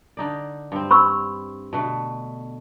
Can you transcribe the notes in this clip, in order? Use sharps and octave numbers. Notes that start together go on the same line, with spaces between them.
D3 D#4 D5
G2 C4
B5 C#6 E6
B2 D3 A3